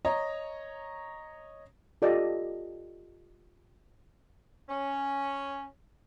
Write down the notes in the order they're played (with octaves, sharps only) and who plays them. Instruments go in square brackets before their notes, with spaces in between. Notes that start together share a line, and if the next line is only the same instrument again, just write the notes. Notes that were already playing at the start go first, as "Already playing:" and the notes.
[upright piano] C#5 D#5 A#5
[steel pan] F4 G4 A4 D5 D#5
[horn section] C#4